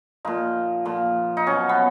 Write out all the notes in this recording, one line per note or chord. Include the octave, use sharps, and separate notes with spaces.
A#2 F3 D#4
A#2 F3
D#4
B2 F#3 C#4
B3